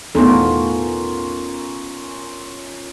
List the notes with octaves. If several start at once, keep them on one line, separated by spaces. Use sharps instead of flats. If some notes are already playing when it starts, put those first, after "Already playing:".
E2 A2 B3 C#4 D#4 F4 A4 A#4